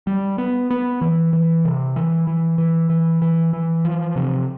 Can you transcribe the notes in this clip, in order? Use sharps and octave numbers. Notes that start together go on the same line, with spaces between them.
G3
B3
B3
E3
E3
C3
E3
E3
E3
E3
E3
E3
F3
C3